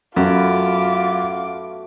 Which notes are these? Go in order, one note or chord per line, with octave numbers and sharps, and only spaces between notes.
F#2 A3 B3 F4 F#4 D6